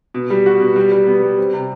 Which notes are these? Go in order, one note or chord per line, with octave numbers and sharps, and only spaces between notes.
B2
G3
F#4
B2
G3
G3
B3
G3
C4
C3